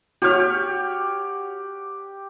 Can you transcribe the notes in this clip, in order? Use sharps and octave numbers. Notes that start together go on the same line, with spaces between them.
F#4 G4 C#5 F6